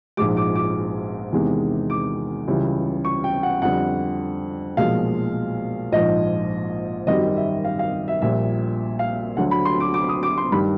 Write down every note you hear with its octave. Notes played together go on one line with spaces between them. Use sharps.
A#1 G#2 F3 G#3 D6
D6
D6
E2 C3 D#3 G#3
D6
C#2 C#3 E3 G3
C#6
G5
F#5
F2 D3 G3 F#5
B1 A#2 F3 G#3 F5
A#1 G#2 F3 D#5
G#1 F#2 D#3 G3 D#5
E5
F5
F5
E5
A#1 A#2 G3 E5
F5
D2 D3 F#3 F#5
B5
C6
D6
D6
D#6
D6
C6
G2 D#3 G3 B5